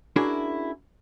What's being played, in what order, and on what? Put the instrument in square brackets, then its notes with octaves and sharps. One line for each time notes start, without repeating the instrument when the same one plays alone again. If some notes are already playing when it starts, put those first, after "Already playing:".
[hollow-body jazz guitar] C#4 D4 E4 F#4 G#4 A#4